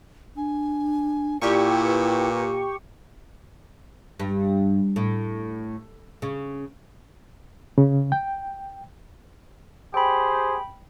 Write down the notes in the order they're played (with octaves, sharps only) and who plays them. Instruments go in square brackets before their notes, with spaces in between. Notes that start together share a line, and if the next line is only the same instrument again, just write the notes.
[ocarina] D4 [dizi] G#5
[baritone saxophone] A#2 [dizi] E4 [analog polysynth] G4 C#6 [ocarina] D5
[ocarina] B4
[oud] G2
A2
C#3
[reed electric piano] C#3
G5
[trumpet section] G4 G#4 C5 [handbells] G5 B5